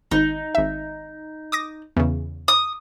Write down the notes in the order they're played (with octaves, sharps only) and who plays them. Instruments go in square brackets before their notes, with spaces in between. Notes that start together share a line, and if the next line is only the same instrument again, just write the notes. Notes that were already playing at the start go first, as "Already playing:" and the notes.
[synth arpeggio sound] G#1 [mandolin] D#4
[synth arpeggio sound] G#1 E5
D6 D#6 A#6
E2 C#3
[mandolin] D#6